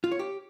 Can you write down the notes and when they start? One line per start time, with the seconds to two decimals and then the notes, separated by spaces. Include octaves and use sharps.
0.04 F4
0.12 C#5
0.19 G4